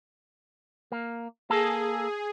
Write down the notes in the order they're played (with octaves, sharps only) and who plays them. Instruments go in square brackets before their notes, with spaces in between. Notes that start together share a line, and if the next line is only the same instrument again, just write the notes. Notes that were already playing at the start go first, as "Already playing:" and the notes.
[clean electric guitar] A#3
[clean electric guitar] A#3 A4 [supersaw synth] G#4